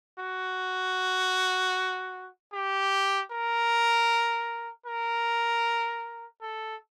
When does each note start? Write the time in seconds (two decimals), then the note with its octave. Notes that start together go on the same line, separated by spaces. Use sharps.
0.19 F#4
2.53 G4
3.31 A#4
4.86 A#4
6.41 A4